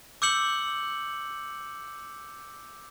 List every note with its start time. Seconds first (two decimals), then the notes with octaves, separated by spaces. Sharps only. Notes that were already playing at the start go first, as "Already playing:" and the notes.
0.22 D6 E6 G6 C#7 F#7